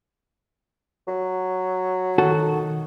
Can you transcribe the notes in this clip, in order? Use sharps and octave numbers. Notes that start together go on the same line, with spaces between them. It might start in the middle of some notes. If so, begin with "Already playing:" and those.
F#3
D#3 F#4 A4